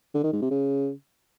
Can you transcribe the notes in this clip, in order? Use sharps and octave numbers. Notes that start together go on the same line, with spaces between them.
D3
D#3
G#2
C3
C#3